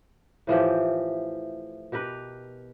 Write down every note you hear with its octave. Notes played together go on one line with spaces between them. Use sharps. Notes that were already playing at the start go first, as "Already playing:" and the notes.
A2 E3 F3 G4
B2 G4 A#4 B4